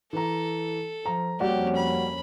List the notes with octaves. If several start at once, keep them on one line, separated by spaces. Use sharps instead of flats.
E3 A4 A#5
F3 A#5
F2 G3 A#3 C#4 F#4 G4 D5
B5